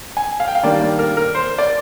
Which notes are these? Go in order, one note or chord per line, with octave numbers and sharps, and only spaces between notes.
G#5
F5
G5
F5
D#3 G3 A#3 D4 D5
D5
A#4
A#4
C5
D5